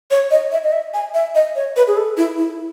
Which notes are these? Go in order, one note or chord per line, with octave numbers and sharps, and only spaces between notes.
C#5
D#5
E5
D#5
E5
G#5
E5
D#5
C#5
B4
G#4
A4
E4
E4